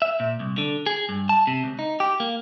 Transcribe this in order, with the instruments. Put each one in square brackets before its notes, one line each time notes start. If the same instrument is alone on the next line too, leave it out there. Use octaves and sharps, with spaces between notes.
[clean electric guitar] E5
A#2
C2
D3
G#4
G2
A5
C3
C#2
D#4
G4
A#3